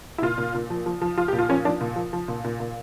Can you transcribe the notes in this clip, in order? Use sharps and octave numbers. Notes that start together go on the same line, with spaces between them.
E4
A#2 F4
A#2
A#2
F3
F3
F3
F3 F4
G4
A#2
F4
F3 C#4
F3 D4
A#2
F3
F3
A#2
A#2
A#2